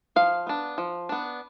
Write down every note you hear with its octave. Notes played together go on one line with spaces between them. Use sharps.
F3 F5
B3 D4
F3
B3 D4